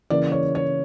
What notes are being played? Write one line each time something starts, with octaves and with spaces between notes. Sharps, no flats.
C#3 E3 A#3 D5
C#5
C#5